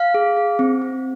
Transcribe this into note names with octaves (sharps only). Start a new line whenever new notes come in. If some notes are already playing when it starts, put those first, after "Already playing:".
Already playing: F5
G#4
G#4
C4
C4